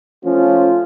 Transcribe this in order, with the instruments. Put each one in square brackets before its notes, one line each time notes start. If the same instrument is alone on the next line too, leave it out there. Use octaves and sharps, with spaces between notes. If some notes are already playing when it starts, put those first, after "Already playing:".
[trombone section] F3 A3 F4 [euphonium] C#4